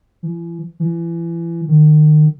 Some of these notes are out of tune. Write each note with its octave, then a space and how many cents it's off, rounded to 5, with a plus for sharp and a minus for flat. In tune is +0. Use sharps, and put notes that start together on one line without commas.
E3 +40
E3 +30
D#3 -35